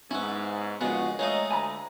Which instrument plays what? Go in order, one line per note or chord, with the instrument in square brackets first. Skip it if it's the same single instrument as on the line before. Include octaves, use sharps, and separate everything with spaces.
[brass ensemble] G#2 [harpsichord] B3 E4 [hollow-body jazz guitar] C#4
[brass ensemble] A#1 F#4 [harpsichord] C#3 G#3 [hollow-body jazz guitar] B3 F4
[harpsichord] G#3 A3 F4 [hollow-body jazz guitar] C#5 [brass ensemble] D#5 A#5
[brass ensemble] D2 [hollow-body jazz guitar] G#5 A#5 B5